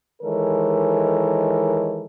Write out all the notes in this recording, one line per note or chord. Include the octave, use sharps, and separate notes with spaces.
D#3 E3 G#3 A4 A#4 C#5